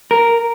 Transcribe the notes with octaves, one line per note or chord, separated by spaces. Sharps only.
A#4